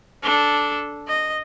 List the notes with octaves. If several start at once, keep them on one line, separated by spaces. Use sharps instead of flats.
D4 A4
D#5